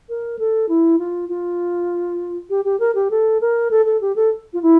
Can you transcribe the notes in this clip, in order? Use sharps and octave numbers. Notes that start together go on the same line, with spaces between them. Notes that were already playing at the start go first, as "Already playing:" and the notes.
A#4
A4
E4
F4
F4
G4
G4
A#4
G4
A4
A#4
A4
A4
G4
A4
F4
E4